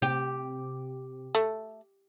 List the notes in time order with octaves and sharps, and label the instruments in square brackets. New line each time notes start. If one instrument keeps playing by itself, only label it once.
[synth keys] C3 [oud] G4
[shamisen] A3